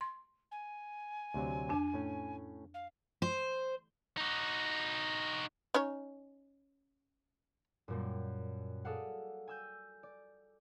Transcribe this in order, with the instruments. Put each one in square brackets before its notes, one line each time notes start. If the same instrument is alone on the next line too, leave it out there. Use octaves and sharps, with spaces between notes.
[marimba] C6
[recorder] G#5
[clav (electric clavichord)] D2 C3 F#3
[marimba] F2 D4
[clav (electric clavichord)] A2 C#4
[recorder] F5
[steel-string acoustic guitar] C5
[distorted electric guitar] D#4 F#4
[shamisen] C#4 D#4 C#5
[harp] F#2 A#2 G3
G#4 A4 D5 F5 F#5
G#5 E6 G6
D5